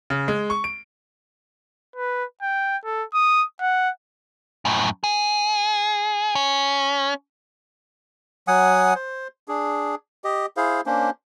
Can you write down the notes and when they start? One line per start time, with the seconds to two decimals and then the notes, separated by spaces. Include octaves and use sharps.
0.10 C#3
0.28 G#3
0.50 C#6
0.64 D7
1.96 B4
2.42 G5
2.85 A4
3.14 D#6
3.61 F#5
4.65 F#2 A2
5.04 G#4
6.35 C#4
8.48 F#3 F#5 G#5 D#6
8.95 C5
9.48 D4 G#4
10.24 G4 D#5
10.57 E4 G#4 C5 F5
10.86 A#3 C#4 D4 C5